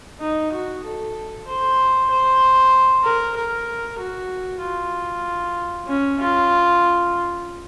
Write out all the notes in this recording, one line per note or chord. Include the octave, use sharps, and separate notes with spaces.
D#4
F#4
A4
C5
C5
A#4
A#4
F#4
F4
C#4
F4